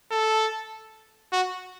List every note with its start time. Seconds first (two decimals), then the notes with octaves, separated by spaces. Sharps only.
0.11 A4
1.32 F#4